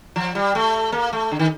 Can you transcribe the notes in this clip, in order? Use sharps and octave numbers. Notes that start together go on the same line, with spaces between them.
F3
G3
A3
A#3
A3
D3
D#3